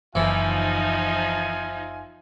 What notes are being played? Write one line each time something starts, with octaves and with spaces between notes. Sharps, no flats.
F#1 E3 F3 D#4 F4 E5 G#5